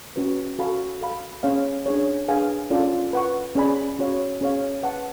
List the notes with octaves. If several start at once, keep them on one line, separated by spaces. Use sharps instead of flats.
C#4 F#4 B4
F#4 A4 F5 G#5 B5
A4 F5 B5
C#4 G#4 C#5 F5
D4 G#4 C#5
D4 G#4 B4 F5 G#5
C#4 F4 A4 D5
B4 F#5 C#6
C#4 G#4 D5 G#5 B5
C#4 F#4 C#5 F5
C#4 G#4 C#5 F5
B4 F#5 A5